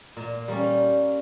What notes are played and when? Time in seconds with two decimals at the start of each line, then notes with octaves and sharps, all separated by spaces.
0.17 A#2
0.48 G3 A#3 C#4